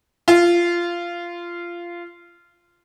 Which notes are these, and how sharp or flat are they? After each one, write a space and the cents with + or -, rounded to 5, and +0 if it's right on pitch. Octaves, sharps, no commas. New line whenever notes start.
F4 -15